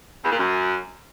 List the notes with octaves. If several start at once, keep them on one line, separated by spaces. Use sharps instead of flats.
E2
A#2
F#2